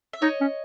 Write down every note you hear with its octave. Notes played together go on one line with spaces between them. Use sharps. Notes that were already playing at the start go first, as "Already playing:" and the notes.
E5
D#4 C#5 D#5
C#4